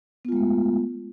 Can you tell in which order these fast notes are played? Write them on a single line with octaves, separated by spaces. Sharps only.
B3 F4 G#3 A3